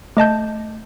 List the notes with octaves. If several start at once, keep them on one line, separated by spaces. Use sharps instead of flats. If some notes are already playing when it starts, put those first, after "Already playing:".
A3 D#5 A5 G6